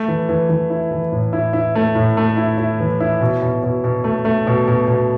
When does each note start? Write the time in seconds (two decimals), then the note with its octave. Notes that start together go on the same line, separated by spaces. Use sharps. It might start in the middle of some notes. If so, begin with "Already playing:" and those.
Already playing: A3
0.08 E3
0.29 E3
0.49 E3
0.70 E4
0.91 E3
1.12 A2
1.33 E4
1.53 E4
1.75 A3
1.95 A2
2.17 A3
2.37 E4
2.58 E4
2.80 E3
3.00 E4
3.21 B2
3.42 B2
3.63 B2
3.84 B2
4.04 A3
4.25 A3
4.47 B2
4.68 B2
4.88 B2